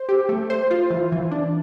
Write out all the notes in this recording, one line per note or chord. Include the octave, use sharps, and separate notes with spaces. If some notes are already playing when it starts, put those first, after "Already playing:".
Already playing: C5
G4
A3
C5
F4
E3
E3
D4